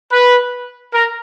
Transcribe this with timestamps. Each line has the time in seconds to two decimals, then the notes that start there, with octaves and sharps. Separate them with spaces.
0.11 B4
0.92 A#4